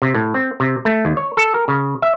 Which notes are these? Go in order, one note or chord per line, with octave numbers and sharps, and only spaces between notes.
C3
A2
C4
C3
A3
D#2
C#5
A4
A#4
C#3
E5